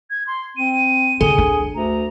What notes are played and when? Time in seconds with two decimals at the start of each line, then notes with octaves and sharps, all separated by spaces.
0.10 G#6
0.27 C6
0.57 C4 D#7
1.21 D3 G#4 A4
1.38 D4
1.75 D2 A#5